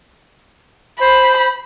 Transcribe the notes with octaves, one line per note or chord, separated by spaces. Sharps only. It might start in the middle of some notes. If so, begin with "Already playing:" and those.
C5 B5